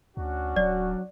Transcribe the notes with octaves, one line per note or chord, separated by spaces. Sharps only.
D2 C#4 D4 F#4
D1 F#3 D5